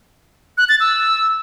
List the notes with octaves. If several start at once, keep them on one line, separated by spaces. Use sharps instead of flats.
F#6
A6
E6